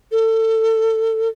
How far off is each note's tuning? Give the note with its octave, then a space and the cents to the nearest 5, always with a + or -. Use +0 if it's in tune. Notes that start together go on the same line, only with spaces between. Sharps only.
A4 +25